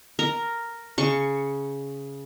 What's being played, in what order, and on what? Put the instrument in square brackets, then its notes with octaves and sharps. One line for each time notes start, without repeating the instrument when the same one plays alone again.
[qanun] A#4
C#3 C#6